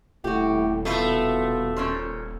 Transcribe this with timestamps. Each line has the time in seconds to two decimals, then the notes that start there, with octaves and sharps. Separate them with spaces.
0.24 D#1 A2 F#4 G4
0.85 B2 F3 A3 E4 F4
1.76 A#2 C#4 C5